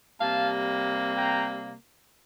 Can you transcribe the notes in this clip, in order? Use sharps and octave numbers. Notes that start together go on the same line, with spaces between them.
C3 G3 A#3 F5 A5
G5 A#5